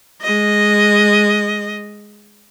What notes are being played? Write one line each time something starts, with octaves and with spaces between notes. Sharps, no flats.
G#3 D#5